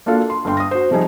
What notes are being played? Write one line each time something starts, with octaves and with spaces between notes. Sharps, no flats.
A#3 D4 F4 F#4 A4 F5
C6
G1 G2 G5 C6
D#6 A#6
F#4 C5
C3 F3 G3 D#4 G#4